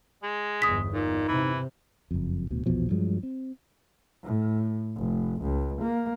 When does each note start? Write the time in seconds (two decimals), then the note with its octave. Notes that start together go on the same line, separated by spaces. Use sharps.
0.23 G#3
0.62 G1 E2 D#6 B6
0.93 A#2 D#4
1.28 C3 E3
2.11 F#1 F2
2.50 D1 D2 B2
2.66 A#1 E2 B2 F3
2.90 G2 F3 F#3 G#3
3.23 C4
4.23 A2
4.96 F1
5.43 C#2
5.82 A#3